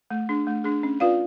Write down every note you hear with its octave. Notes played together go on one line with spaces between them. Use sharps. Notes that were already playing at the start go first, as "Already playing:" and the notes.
A3
D4 G#4
A3
D4 G#4
C#4
F4 B4 D5 F5